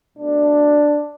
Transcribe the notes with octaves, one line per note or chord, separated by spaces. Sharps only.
B2 A3 D4